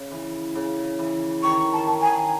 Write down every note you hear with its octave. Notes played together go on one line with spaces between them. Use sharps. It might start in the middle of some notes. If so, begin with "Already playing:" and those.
Already playing: C#3
E3
C#3
E3
D#3 C#6
A5
D#3
G#5